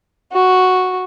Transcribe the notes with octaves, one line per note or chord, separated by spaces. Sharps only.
F#4